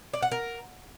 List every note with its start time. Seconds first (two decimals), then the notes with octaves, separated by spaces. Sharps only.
0.13 D5
0.22 F#5
0.31 A#4